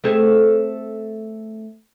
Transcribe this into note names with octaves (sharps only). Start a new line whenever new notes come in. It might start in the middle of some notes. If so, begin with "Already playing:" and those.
A3 C4 G#4